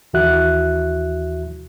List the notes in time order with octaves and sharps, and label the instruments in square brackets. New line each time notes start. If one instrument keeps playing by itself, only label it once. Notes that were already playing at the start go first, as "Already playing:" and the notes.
[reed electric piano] D#2 E3 F#4 E5 F#6